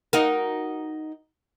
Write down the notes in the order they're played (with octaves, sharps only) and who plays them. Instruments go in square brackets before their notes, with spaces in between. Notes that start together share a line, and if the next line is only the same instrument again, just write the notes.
[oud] D#4 F#4 A#4